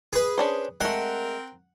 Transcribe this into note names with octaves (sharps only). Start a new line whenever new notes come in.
G#4 B4
C#4 D4 C5
G#3 A3 C4 A#4 F#5